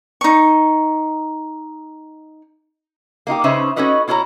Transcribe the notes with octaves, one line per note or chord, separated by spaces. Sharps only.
D#4 C#6
A#3 D#4 F4 G4
C#3 C#4 D#4 B4 C5 E5
C#4 D#4 F#4 A4 B4 D#5
B2 E4 F#4 C#5 A#5